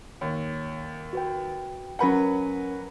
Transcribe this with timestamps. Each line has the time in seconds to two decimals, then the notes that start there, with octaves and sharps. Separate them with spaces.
0.21 D#2 C#5
1.13 F#4 B4 G5
1.99 F#3 C#4 A#4 B4 F#5 G#5